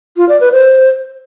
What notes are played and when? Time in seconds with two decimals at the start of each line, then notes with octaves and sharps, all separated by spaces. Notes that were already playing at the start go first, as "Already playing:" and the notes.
0.17 F4
0.29 D5
0.41 B4
0.52 C5